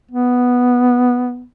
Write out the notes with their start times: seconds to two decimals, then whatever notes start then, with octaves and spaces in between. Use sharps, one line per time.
0.11 B3